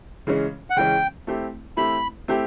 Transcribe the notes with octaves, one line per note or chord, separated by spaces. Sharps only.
C#3 E3 G#3 C#4
F#5
C#3 E3 G#3 C#4 G5
A3 C4 E4 G4
A3 C4 E4 G4 B5
A3 C4 E4 G4